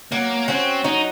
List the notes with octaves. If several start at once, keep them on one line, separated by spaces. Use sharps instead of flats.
F#3 A#3
C4 C#4 F#4
F#3 D#4